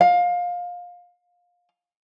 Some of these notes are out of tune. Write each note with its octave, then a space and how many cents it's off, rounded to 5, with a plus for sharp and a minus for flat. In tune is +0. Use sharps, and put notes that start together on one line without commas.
F5 +25